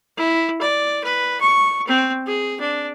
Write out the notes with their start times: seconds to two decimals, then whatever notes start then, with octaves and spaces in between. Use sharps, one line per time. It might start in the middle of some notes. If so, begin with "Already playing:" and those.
0.17 E4
0.61 D5
1.04 B4
1.41 C#6
1.87 C4
2.27 G#4
2.60 D4